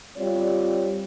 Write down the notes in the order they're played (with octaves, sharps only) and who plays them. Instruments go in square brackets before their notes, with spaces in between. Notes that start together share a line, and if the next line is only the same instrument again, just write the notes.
[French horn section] G3 C4 F4 C#5 D5